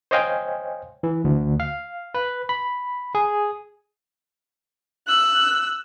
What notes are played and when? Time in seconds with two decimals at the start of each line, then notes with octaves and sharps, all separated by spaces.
0.11 C5 C#5 D#5 F5 G5 G#5
1.03 E3
1.24 D2
1.60 F5
2.15 B4
2.49 B5
3.15 G#4
5.08 E6 F#6